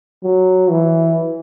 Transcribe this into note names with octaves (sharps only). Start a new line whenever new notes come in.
F#3
E3